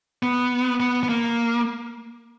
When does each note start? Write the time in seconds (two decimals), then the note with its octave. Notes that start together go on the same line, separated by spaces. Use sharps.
0.23 B3
0.80 B3
1.03 B3
1.09 A#3